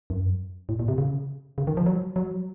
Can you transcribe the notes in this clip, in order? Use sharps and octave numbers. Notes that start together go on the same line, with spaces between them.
F#2
A2
A#2
C3
C#3
C#3
D#3
F3
F#3
F#3